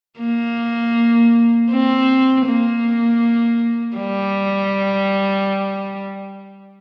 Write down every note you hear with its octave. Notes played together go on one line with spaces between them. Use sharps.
A#3
C4
A#3
G3